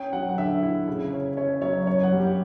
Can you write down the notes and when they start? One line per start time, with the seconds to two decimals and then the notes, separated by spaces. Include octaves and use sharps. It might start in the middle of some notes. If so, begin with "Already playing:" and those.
Already playing: C#4 G5
0.13 F#3 F#5
0.29 F#5
0.38 D3 E5
0.63 E4
0.88 C#3
1.12 C#4
1.37 C#4 C#5
1.62 F#3 C#5
1.87 F#2 C#5
2.03 F#5
2.12 G3
2.20 G4